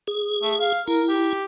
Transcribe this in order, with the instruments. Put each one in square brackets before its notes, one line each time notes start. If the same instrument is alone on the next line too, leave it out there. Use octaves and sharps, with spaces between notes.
[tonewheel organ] G#4
[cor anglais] A3
F5
[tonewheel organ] E4 [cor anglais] A#4
[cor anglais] G4